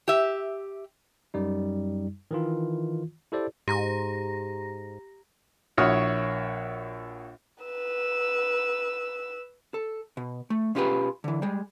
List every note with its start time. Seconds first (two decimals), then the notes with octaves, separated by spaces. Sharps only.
0.08 G4 E5
1.34 F#2 G3 D#4
2.31 D#3 E3 F4
3.32 E4 G4 A4 C5 D5
3.68 G#2 G4 A#5 A#6
5.77 A#1 E4 F#4 C#5 D#6 F6
7.63 B4 E6
9.74 A4
10.17 B2
10.50 A3
10.75 B2 C#4 F4 G4 G#4 B4
11.24 D3 E3
11.42 G3 G#3